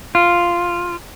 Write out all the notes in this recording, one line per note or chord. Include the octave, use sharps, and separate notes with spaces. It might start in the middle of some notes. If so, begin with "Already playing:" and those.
F4